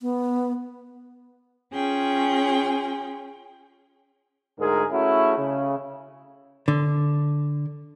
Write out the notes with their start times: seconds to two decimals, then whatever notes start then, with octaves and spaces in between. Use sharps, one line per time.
0.02 B3
1.74 C#4 F4 G#4 G5
4.59 D2 G#2 G#4 A#4
4.91 A3 C#4 E4 F#4 G#4
5.38 C#3
6.68 D3